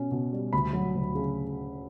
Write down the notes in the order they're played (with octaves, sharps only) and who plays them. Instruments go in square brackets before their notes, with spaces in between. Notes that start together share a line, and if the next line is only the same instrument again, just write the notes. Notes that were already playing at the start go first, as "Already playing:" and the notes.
Already playing: [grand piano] B2 C#4
B2
G3
D2 B5
F#3
D2
C#3